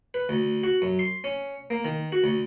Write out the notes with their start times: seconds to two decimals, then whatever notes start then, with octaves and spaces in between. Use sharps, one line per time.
0.14 B4
0.29 D2
0.64 F#4
0.82 F#2
0.99 C6
1.24 C#4
1.70 A#3
1.85 D#3
2.12 F#4
2.24 D2